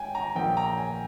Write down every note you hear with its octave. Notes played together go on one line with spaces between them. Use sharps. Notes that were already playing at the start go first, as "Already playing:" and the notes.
Already playing: G#3 G5 G#5
A#5
A#1 A#2 F3 G5
A#5
G#5